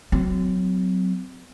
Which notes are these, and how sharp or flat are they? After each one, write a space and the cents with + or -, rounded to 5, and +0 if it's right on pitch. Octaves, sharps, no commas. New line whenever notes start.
F#3 +0 C4 -40